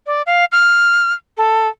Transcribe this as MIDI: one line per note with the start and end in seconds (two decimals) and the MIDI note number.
0.07 0.22 74
0.26 0.45 77
0.52 1.13 89
1.37 1.68 69